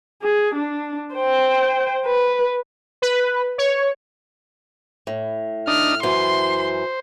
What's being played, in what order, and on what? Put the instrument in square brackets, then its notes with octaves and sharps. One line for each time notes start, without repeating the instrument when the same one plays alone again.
[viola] G#4
D4
C5 G5
B4
[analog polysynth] B4
C#5
[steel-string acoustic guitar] A2
[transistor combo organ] D4 D#4 D#6 [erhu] F6
[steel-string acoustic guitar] F#2 E3 [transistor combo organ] C5 [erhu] C6